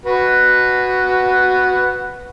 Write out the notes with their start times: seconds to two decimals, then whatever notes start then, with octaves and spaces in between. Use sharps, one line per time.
0.05 F#4 B4 F#5